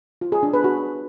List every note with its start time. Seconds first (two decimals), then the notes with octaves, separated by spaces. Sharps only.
0.21 F4
0.32 G#4
0.43 D4
0.53 B4
0.64 F#4